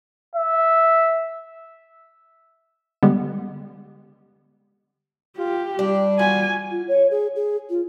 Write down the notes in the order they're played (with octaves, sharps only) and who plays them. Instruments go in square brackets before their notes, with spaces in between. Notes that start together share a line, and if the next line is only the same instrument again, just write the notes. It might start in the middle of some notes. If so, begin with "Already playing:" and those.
[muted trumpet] E5
[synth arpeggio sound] D3 G3 G#3 B3 G4
[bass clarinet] F4 [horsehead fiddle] G4
[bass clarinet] G3 [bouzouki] D4
[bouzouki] B3 F4 F#4 [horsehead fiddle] G#5
[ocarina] F4
C#5
G#4
G#4
F4